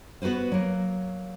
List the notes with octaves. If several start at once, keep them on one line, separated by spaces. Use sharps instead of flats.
B3 F#4 A4 B4 C5
F#3 A#3